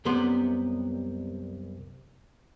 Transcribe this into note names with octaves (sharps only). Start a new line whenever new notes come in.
C2 F#2 C3 G3 B3 C6